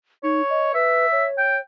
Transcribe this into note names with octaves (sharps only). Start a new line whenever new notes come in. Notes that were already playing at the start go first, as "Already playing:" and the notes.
D#4 C#5
D#5
B4 E5
C#5
G5